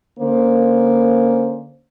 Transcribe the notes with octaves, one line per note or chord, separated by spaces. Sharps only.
D3 A#3 C#4 C5